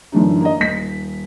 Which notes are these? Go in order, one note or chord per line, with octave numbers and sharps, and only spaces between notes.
F#2 D3 E3 D4 D#4
A#3 D#5
D#1 B6